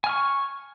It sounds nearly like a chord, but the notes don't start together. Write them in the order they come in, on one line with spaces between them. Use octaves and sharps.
G#5 F6 C#6